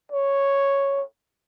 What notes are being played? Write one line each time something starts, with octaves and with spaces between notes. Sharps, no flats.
C#5